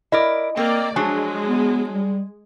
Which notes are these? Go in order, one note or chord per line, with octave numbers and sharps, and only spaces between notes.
E4 A#4 D5 D#5
A#3 C4 A#4 D5
F3 F#3 G#3 D4 G#5
B3
G3